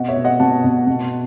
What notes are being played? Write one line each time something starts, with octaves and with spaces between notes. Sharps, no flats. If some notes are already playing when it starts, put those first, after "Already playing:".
Already playing: B2 D#5 F#5
C#5 E5
B2
D#5 F#5
B2 F#5 A5
B2
B2